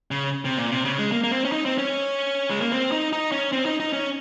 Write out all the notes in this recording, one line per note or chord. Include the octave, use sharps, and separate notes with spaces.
C#3
C3
A#2
C3
C#3
G#3
A#3
A#3
C4
C#4
D#4
C4
C#4
G#3
A#3
C4
D#4
D#4
C#4
C4
D#4
D#4
C#4